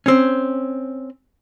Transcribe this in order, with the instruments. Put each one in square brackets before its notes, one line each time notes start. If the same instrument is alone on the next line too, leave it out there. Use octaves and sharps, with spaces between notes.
[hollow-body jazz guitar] C4 C#4